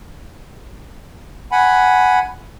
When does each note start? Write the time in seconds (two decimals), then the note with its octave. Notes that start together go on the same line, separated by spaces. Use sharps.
1.52 F#5 G#5 B5